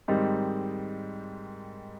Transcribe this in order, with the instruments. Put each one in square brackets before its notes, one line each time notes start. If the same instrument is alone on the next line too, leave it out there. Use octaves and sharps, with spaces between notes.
[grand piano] G#2 D#3 G3 C4 D#4